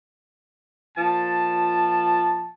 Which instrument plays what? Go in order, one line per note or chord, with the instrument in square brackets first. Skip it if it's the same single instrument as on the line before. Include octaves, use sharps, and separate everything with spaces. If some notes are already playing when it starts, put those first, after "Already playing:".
[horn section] A#2 F3 A5